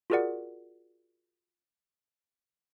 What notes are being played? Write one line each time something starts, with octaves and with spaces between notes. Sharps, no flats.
F4 F#4 G#4 A#4 D5 F#5